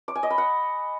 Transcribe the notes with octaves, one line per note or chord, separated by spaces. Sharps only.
D6
G#5
D#5
B5
F#5